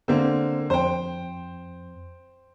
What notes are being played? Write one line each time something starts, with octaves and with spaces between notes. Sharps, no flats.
D3 A#3 C4 A#4 C5
F2 C5 G5